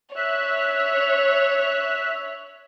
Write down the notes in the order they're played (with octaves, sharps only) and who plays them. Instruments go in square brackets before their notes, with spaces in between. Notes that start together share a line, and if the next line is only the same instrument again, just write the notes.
[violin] C#5 [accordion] E5 F#6